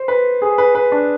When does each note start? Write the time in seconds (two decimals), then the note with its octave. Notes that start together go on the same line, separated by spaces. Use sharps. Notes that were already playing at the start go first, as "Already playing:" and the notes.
Already playing: C5
0.08 B4
0.42 G#4
0.58 B4
0.75 B4
0.92 D4